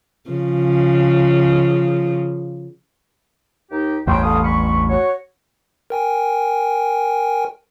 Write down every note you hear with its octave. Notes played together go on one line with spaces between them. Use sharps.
C#3 F3
D#2 D#4 G4
A1 E2 G2 C5 C#5 G5
A4 F5 D#6
B5 C#6
F#4 C#5
A#4 G5 G#5